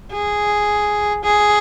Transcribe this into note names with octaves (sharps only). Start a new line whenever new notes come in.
G#4
G#4